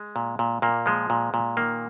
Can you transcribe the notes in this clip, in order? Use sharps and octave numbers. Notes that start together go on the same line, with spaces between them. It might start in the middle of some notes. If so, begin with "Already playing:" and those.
Already playing: G#3
A#2
A#2
A#2 A#3
F3 G#3
A#2
A#2
D#3 A#3